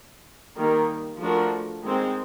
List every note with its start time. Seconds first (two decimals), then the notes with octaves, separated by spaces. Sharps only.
0.56 D#3 G3 A#3
1.19 F3 A3 D4 F#4 A#4
1.83 D#3 G#3 C4